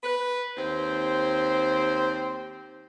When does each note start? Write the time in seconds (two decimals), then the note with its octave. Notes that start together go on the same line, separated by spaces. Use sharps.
0.03 B4
0.57 D#2 C4 C5